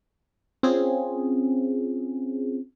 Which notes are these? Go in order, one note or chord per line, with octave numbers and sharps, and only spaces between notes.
C4 C#4 F4 G#4